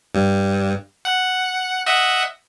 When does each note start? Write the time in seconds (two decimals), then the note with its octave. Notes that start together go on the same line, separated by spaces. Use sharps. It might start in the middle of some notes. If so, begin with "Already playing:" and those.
0.15 G2
1.05 F#5
1.86 D#5 E5 F#5